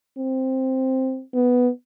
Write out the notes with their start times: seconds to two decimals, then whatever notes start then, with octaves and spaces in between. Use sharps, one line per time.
0.18 C4
1.34 B3